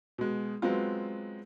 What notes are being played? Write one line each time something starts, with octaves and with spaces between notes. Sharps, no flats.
B2 G#3
F#3 G#3 B3 C4 F4